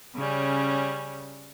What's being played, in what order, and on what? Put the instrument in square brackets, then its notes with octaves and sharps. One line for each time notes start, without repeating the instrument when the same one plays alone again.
[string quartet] C#3 G3 C#4